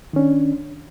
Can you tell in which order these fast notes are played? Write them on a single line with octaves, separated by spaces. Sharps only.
D#3 C#4 D4